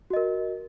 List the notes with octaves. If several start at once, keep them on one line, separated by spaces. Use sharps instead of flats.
F#4 A#4 D#5